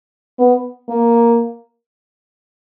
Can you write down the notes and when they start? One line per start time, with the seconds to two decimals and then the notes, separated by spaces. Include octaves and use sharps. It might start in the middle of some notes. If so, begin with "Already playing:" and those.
0.38 B3
0.89 A#3